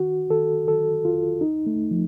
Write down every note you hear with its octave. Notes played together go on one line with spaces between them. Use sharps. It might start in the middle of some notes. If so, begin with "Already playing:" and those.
Already playing: D#3 F#4
D#3 A4
D#3 A4
F2 F4
D#2 D#4
A3
D#2
F3